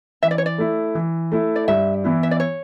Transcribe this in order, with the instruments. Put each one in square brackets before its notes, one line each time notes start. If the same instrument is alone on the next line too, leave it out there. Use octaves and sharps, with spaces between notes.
[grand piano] E3 [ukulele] E5
[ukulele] D5
C#5
D5
[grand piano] A3 E4
E3
A3 E4
[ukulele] D5
[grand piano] G2 [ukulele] E5
[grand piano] E3 B3 E4
[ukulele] E5
D5
C#5